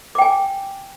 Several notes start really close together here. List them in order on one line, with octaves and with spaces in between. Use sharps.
D6 G5 G#5